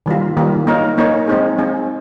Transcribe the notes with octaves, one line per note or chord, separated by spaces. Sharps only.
D#3 G3 A#3 F4
D#3 G3 A#3 F4
A#3 D#4 A#4 C#5
A#3 D#4 A#4 C#5
G#3 C4 D#4 G#4
G#3 C4 D#4 G#4